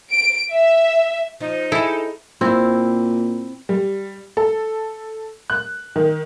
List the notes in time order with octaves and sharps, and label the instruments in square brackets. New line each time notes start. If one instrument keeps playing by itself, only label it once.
[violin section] D7
E5
[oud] F3 [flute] D#4
[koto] E4 [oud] G#4 [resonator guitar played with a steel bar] A4
[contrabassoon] A#2 [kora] C4 E4
[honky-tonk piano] G3
A4
F#6
D#3